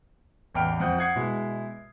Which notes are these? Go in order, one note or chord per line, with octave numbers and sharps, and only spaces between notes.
A1 E2 G5 B5 F6 D7
F2 C4 F#5 D#6 G6
F#5 D#6 G#6 C7
B2 G#3 E4